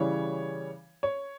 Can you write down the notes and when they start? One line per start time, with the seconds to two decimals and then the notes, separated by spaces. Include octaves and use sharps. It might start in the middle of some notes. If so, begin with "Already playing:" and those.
Already playing: C#3 E3 G3 C#5
1.03 C#5